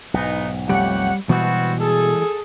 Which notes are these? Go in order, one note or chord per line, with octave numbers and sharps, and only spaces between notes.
B1 G#2 E3 B3 D#4
B1 F2 G3 A3 G4 C#5 F#5
B2 E3 G3 G#3 B3 C4 F#4
G#4 A4